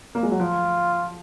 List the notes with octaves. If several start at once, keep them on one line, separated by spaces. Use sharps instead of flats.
A#3
G#3
F#3
F3 F4